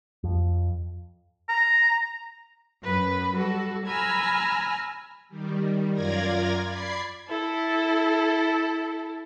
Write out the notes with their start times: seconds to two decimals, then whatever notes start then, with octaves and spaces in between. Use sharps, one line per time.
0.24 F2
1.49 A#5
2.83 F#2 B4 B5
3.37 G3 F#4 A4
3.87 G#5 A#5 B5 E6 F6
5.29 D#3 G3
5.93 F#2 F4 A#4 D5 G#6 A#6
6.67 D5 B5 G#6 C7
7.28 E4 A4